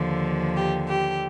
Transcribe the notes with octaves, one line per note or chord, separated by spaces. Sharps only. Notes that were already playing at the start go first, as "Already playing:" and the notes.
Already playing: D#2 D3 F3
G4
G4